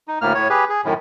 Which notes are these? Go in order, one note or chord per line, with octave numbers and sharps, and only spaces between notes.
D#4
D2 A2 A#3 F6
A2 C#5
G4 G#4 B4
G#4
F#2 A2 D#3